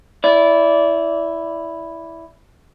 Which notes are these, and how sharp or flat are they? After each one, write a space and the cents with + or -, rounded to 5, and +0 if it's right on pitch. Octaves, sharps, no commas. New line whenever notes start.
E4 +0 D5 -20